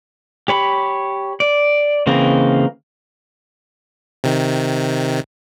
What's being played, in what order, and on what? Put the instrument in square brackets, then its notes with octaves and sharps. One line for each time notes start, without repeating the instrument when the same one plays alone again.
[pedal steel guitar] G4 C#5 B5
D5
C#3 E3 A#3 C4 D#5
[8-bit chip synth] C3 D#3